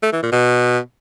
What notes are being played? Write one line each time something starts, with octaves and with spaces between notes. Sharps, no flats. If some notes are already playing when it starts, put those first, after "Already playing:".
A3
E3
A#2
B2